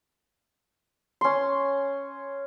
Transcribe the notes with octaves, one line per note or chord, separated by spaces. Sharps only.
C#4 C6